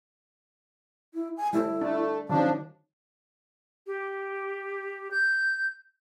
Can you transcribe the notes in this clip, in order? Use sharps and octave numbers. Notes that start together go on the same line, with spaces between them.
E4
G#5
G3 A3 E4
A3 D4
D#3 F3 F#3 C#4 D4
G4
G6